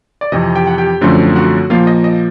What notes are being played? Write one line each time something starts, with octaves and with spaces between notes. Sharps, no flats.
D5
F2 C3 E3 D#5
G4 G5
F#5
G4 G5
F#2 D3 F3 A3 C4
F#4 F#5
A#2 F3 A#3 F4 F5
D#5
D#5